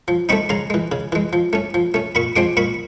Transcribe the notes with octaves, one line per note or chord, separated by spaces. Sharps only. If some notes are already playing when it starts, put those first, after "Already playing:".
F3
A3 C4 D#4 B5 C#6
C#3 A#5 C6
E3 G#3
C#3
E3 G#3
F3
A3 C#4
F3
A3 C#4
A#2 B5 C#6
F3 G#3 C4 C6 D6
A#2 B5 C#6